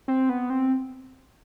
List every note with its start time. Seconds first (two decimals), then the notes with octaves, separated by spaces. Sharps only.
0.08 C4
0.29 B3
0.50 C4